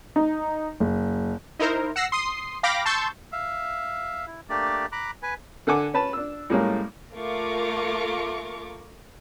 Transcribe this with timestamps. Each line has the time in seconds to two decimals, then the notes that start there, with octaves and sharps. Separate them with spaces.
0.16 D#4
0.80 F#1
1.59 D#4 E4 A#4 C5
1.96 F#5 E6 A#6 C7
2.12 C6 D#6 C7
2.63 F5 G5 B5 D6 A#6
2.86 A5 C6 C#6 E6 G6 A6
3.32 E5 F5
4.27 E4
4.49 A3 A#3 D4 G4 D5
4.92 A#5 B5 D6 F#6
5.23 B4 G#5
5.67 D3 A4 F#5 G#5 D6
5.94 C#4 B4 A5
6.13 D4 E6
6.50 A2 G3 G#3 A#3 C#4
7.15 A3 A#3 F4 A#4 C#6 D6